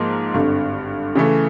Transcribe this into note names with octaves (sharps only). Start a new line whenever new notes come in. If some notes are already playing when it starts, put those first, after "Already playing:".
Already playing: G#2 F3 A#3
G#1 G2 D3
C#3 E3 A3